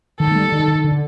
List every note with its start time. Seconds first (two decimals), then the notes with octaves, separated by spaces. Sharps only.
0.20 D#3 A4
0.31 A3
0.35 G3
0.52 D#3
0.68 D#3
0.84 D3